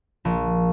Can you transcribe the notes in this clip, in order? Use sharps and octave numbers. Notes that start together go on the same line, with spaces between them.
A#1